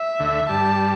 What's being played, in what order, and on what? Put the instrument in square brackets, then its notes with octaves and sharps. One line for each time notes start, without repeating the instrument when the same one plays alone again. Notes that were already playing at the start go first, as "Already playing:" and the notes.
Already playing: [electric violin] E5
[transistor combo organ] D2 D3
[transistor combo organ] G2 G3 [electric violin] A5